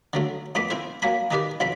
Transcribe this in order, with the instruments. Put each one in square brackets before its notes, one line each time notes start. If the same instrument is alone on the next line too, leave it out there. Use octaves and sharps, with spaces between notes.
[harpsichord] D3 F#3 A3
F2 A3 B3 B5 D6
C4 E4 C5
F#3 A#3 G#5 B5
D#3 D#4 G4 B4 D5
B1 F2 C4 B5